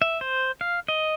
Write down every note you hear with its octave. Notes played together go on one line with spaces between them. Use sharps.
E5
C5
F5
D#5